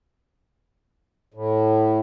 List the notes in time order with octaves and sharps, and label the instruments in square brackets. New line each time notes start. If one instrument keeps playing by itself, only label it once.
[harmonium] A2